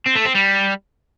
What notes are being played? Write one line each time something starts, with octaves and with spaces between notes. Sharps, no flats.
C4
A3
C4
G3